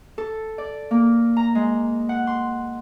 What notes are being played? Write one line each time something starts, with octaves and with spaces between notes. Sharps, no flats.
A4
D5
A#3
A#5
G#3
F#5
C6